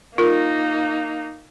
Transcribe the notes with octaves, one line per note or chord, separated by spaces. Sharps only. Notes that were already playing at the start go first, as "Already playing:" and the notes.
A#3 D#4 F4 A#4